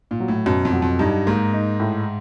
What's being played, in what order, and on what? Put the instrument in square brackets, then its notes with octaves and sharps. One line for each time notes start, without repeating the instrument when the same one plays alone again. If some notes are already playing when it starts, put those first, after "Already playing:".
[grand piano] A#2
[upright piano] F#3
[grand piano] A2
[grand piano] F#2 [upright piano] B2
[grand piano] F2
[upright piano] F#3
[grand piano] F2
[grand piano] G2 [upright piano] D#4
[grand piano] G#2 [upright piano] A#3
[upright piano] D#4
A2